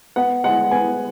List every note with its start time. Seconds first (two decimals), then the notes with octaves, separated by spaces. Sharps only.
0.16 B3 F#5
0.44 G#3 F#5
0.71 B3 G#5